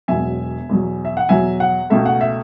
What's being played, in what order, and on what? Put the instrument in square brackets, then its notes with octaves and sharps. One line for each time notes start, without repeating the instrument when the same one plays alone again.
[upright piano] E1 E2 B2 F#3 E5 G#5
E2 B2 F#3
E5
F#5
E2 B2 F#3 E5 G#5
F#5
C#2 B2 A3 E5
F#5
E5